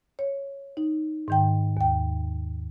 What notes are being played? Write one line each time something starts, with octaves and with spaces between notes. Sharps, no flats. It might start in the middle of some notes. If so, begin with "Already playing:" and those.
C#5
D#4
G#2 D#3 G5
D#2 G5